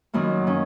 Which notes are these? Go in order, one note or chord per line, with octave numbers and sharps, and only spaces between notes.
F#2 D#3 A#3
D#3 C#4